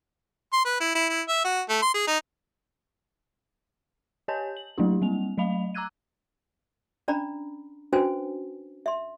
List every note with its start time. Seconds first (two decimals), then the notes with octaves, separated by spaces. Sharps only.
0.53 C6
0.65 B4
0.81 E4
0.95 E4
1.09 E4
1.29 E5
1.45 F#4
1.70 A3
1.82 C6
1.94 G#4
2.07 D#4
4.28 G4 C#5 D#5 G#5 A5 G6
4.57 F#7
4.78 F#3 A3 A#3 D4 E4 G4
5.02 G3 A#3 C4 F7
5.38 F#3 A3 D#5 F5 B5 F7
5.74 A#5 D6 E6 F#6 G#6 D#7
7.08 C#4 D4 D5 A#5 B5
7.93 C#4 D4 F#4 B4 C5 G#5
8.86 E5 C6